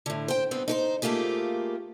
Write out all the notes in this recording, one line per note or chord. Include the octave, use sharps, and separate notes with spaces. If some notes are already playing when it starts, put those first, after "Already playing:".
A2 D3
C5 G5
G2 B3 C4
D#4 A#4 C5
A3 A#3 F4 G4 G#4